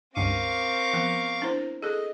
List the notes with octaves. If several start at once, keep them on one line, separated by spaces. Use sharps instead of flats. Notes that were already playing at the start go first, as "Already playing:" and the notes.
C#2 G2 C4 A#4 F5 C#6 D6 D#7
F3 B3
D4 E4 C5
G#4 A4 D#5